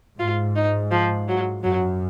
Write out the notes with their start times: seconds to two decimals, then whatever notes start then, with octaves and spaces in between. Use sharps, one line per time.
0.18 G#2 F4
0.56 D#4
0.91 F3
1.28 F#3
1.63 F#2 F#3